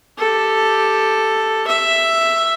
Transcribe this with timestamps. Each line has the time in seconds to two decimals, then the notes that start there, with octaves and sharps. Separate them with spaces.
0.18 G4 A4
1.67 E5